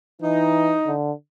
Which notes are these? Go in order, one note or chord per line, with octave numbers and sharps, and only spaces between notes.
E3 D#4
D3